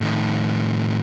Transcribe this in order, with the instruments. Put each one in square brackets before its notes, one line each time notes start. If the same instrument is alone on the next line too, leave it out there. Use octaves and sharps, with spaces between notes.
[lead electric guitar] A2 D#3